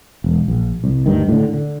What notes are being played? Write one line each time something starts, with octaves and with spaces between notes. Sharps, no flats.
E1
A#1
C2
D2 G2 D#3
A2 D3
D3